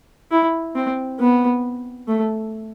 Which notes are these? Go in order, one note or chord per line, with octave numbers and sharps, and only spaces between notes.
E4
C4
B3
A3